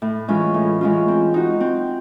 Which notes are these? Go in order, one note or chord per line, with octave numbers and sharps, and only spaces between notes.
A2
E3 G#3 C#4 F4
A2
E3 G#3 C#4 F4
C4
D#4 F#4
C4